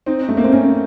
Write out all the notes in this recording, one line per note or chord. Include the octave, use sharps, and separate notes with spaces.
C4 D#4
A3
A#3
C4
A#3 C#4